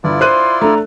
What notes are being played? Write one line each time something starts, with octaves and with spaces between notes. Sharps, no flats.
G1 E4 F4 D5
C5 C6 F#6 D#7
A3 D4 A#5